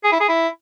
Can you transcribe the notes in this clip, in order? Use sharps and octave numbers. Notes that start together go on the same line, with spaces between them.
G#4
E4
G#4
E4